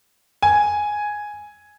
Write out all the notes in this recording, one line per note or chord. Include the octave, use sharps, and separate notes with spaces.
G#5